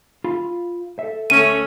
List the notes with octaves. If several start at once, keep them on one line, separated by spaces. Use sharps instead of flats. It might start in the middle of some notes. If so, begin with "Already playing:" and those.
F4 F5 B5
A4 E5
D2 A3 C#4 D#7